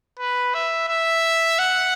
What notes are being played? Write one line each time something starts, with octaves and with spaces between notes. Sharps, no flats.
B4
E5
E5
F#5